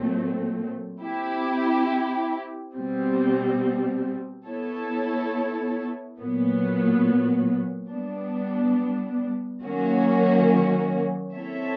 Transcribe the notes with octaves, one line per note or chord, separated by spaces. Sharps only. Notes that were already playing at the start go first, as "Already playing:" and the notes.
Already playing: A#2 F#3 A3 C4
C4 E4 G4
B2 G3 C4
B3 E4 A4 C#5
A#2 F#3 B3
G3 B3 D4
D#3 F#3 A#3 C#4 F#4
C4 E4 A4 C#5 E5